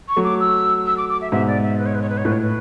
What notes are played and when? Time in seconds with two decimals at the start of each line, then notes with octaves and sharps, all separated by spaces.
0.09 C#6
0.16 F#3 A3
0.24 D6
0.40 E6
0.86 E6
0.97 D6
1.09 D6
1.21 E5
1.32 G#2 B2 E5
1.47 D5
1.63 E5
1.78 B4
1.86 C#5
1.95 B4
2.02 C#5
2.09 B4
2.18 C#5
2.25 A2 B4
2.32 C#5
2.41 B4